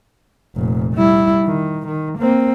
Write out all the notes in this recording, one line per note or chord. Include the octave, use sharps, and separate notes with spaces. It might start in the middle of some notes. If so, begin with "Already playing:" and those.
F1 A#2
G3 E4
D#3
D#3
A#3 C4